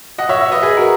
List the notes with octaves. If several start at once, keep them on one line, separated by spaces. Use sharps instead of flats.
D#5 F#5
C#5 E5
C#5 E5
B4 D#5
G#4 B4
F#4 A#4